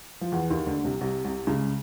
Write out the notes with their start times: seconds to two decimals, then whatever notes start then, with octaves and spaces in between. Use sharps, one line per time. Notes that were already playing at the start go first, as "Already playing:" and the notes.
0.21 F3
0.32 E2 E3
0.50 D#2 D#3
0.66 D2 D3
0.84 C2 C3
1.01 C2 C3
1.24 C2 C3
1.47 C#2 C#3